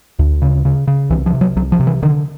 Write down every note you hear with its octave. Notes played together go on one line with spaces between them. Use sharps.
D2
C#3
C#3
C#3
C2 E3
F3
C3
F#3
C2 F#3
F3
C3
E3
D3 D#3